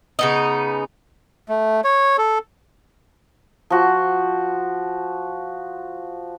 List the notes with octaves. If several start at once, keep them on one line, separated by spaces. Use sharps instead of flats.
C#3 B3 D#4
A3
C#5
A4
F3 F#4